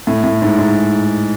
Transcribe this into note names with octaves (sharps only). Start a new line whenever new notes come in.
A2
A2
G#2
G#2